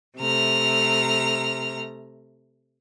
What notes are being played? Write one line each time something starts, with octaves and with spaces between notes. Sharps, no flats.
C3 A3 A#5 F6